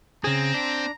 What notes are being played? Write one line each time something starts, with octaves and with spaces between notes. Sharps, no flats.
C#3 C4 G#4 A#5
D4